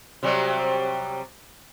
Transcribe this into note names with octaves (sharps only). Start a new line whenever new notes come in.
C3 F#3 G3